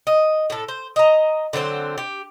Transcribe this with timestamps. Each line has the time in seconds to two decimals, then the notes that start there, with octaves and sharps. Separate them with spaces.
0.07 D#5
0.50 A2 A4
0.68 C5
0.96 D#5 A#5
1.53 D3 F#3 C4 C5
1.98 G4